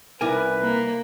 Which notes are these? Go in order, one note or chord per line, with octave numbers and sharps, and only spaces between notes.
C2 D#4 E4 A#4 B4 G#5 D6
A#3